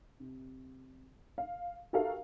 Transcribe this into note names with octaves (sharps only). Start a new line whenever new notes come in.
C3
F5
F#4 G4 A4 A#4 E5 F5